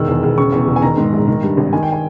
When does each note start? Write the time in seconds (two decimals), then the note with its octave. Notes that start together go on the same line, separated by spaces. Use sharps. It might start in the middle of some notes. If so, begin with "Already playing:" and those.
Already playing: E1 D#3 E6
0.08 E2
0.23 E1
0.37 C#3 C#6
0.53 E2
0.68 E1
0.76 G#5
0.82 D#3 A#5
0.97 G#2
1.13 A#1
1.28 D#3
1.43 G2
1.57 G#1
1.73 D#3 G#5
1.83 G5
1.93 G#5